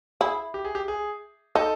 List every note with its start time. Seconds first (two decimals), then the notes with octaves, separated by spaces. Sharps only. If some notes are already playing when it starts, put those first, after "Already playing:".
0.21 E4 G#4
0.54 G4
0.65 G#4
0.75 G4
0.88 G#4
1.55 D#4 A4